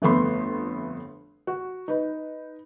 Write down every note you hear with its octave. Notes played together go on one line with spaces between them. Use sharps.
G1 F2 A3 B3 B5 C6
F#4
D#4 B4